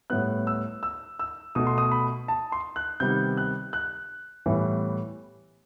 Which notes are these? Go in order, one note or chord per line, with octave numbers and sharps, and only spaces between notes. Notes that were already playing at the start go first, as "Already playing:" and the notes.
A2 G3 B3 F#6
E6
E6
E6
B2 A3 D#6
C6
D#6
B5
A5
C6
F#6
C3 D#3 G3 B3 G6
F#6
F#6
A2 E3 G3 B3